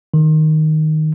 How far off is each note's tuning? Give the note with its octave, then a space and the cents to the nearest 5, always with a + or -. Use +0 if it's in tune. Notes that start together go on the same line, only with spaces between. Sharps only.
D#3 +0